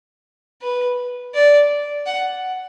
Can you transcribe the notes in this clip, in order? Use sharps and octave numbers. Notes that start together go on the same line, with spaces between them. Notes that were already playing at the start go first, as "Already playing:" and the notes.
B4
D5
F#5